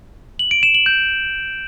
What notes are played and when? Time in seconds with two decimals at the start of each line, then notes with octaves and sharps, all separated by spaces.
0.39 F#7
0.51 D7
0.63 E7
0.75 F#7
0.86 G6